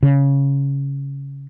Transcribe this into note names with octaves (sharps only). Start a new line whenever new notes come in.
C#3